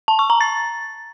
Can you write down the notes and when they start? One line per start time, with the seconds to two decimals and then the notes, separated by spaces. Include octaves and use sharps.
0.08 A5
0.19 C#6
0.30 A#5
0.41 A6